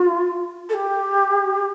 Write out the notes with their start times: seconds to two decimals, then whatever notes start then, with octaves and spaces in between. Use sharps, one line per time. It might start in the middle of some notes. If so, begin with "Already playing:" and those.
Already playing: F4
0.69 A4
0.73 G4